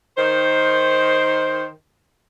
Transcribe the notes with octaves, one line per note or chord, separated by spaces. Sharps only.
D#3 C5